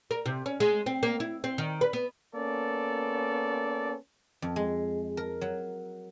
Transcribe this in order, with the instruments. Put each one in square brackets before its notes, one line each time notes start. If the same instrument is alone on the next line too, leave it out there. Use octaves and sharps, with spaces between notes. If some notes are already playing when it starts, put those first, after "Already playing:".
[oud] A#4
C3
C#4
G#3
C4
A#3
E4
C4
D#3
B4
B3
[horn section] A#3 B3 C#4 A4 D5
[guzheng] F2
G#3
A#4
F#3